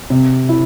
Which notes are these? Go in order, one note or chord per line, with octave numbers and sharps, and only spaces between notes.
C3
E4